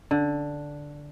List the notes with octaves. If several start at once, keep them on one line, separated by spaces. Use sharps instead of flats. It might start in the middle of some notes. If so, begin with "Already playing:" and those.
D3